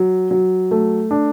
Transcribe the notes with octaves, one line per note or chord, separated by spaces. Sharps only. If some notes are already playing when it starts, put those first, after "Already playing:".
Already playing: F#3
F#3
A3
D4